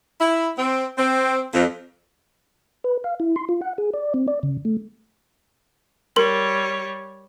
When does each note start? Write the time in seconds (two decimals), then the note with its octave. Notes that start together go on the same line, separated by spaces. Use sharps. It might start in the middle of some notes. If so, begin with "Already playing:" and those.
0.21 E4
0.58 C4
0.98 C4
1.54 F2
2.84 B4
3.04 F5
3.20 E4
3.36 C6
3.49 F4
3.61 F#5
3.78 G#4
3.94 D5
4.14 C4
4.28 D5
4.43 C#3
4.65 A3
6.16 G3 A#4 C#5 C6 F#7